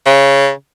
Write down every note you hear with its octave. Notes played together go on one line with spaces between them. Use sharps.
C#3